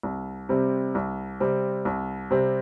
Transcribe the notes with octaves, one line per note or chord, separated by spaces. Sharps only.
C2
C3 G3 C4
C2
C3 G3 C4
C2
C3 G3 C4